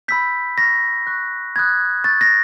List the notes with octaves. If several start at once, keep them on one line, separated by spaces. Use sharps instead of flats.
B5 E6 G6 B6
C#6 F6 A#6
C#6 F#6
B5 D#6 F#6 G#6
C#6 E6 G6 A6
A#6